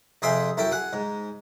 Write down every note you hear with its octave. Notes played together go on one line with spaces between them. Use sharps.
F2 C3 G#4 E5 G5 C6
F#2 E4 A4 G5
G#4 F#5
G#2